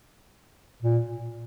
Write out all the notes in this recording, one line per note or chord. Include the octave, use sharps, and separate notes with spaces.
A#2